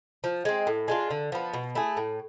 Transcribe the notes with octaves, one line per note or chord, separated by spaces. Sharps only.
F3
G#3 C4
A2
G#3 D4 F4
D3
F3 B3
B2
A3 E4 G#4
A2